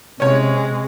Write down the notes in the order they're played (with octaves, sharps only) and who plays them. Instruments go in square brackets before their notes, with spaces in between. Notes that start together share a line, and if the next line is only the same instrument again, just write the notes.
[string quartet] C3 G#3 [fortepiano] C#4 C#5